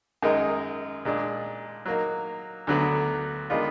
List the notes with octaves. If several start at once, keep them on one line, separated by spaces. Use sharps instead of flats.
F#2 D#3 G#3 D#4 A#4
A#2 G#3 D4
F#3 A#3 D#4
D2 D3 F#3 B3
D#3 G#3 B3 D4 F4